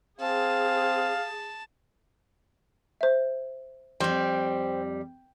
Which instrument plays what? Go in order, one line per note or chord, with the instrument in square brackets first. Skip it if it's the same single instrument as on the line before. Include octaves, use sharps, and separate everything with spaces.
[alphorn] C4 [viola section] G#4 [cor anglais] F5 [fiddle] A5
[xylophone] C5 E5
[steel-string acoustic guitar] F2 G3 [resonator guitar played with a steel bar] C4